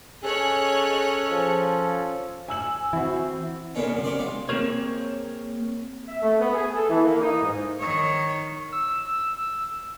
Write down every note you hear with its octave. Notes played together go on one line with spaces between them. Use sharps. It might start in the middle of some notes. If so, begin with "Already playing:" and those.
C#4 G#4 A4 C#5 D#5 F#6
F3
G#5 E6 F#7
E3 C4 E4 F#4
E2 A#2 D3 B3 C#4 D#4
F#2 C3
G4 A#4 C5 D5
B1 G#3 D#4 F5
A#3 C4 F4 G#4 A#4 C#5
E5
A3
B3
G#4
A4
E3
A#3
D#4
G#2
D#3 C#5
E6